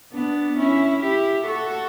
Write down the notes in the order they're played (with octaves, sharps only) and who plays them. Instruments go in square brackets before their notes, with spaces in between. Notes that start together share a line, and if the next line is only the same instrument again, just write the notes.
[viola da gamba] B3 D4
C#4 E4
E4 G4
F#4 A4